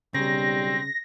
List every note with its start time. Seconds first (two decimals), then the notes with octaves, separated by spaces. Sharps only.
0.14 B1 C#3 G3 C4 A#6